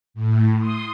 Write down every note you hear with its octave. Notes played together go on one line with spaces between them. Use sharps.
A2
C6 D#6